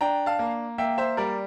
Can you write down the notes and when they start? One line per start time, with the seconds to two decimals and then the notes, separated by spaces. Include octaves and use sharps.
0.01 D4 G5 A#5
0.26 F5 A5
0.39 A#3
0.78 A#3 E5 G5
0.98 C5 E5
1.17 G3 A#4 D5